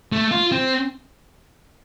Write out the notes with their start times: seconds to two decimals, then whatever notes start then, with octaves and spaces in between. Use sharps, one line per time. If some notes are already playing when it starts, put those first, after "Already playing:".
0.12 A3
0.31 F4
0.52 C4